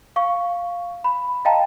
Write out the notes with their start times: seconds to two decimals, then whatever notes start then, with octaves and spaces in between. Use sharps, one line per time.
0.16 F5 C#6
1.04 B5
1.45 D#5 F5 G5 A5 A#5